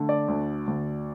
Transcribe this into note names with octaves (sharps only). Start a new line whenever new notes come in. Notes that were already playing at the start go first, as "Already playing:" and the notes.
Already playing: D3 A3
D5
D2
D2